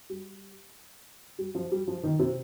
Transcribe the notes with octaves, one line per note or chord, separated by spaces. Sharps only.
G3
G3
F3
G3
F3
D#3
C3